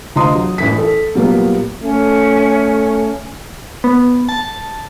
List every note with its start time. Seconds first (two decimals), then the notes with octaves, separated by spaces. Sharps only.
0.16 D2 F4 D#5 A#5 C6 D#6
0.35 F#3
0.58 A1 E3 B6
0.78 A4
1.15 A#2 F#3 G3 A#3 B3
1.81 A3 C#4
3.84 B3
4.29 A5